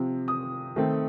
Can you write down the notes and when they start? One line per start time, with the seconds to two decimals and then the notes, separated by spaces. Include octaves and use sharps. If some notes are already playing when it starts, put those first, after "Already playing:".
Already playing: C3 F3 C4
0.28 D#6
0.76 D#3 A3 C4